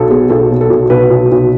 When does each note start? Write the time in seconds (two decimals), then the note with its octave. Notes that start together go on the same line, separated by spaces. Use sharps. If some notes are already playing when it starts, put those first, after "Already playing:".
Already playing: B1 B2 A4
0.10 B2 G#4
0.30 B1 A4
0.51 B2
0.61 A4
0.70 B1
0.90 B1 B4
1.10 B1
1.31 B1